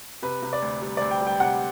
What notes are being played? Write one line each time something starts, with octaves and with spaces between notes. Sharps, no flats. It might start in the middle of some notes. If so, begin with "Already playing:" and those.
C3 B4
C3
D5
D2
G3
D2 D5
G5
G3
G5
C3 F#5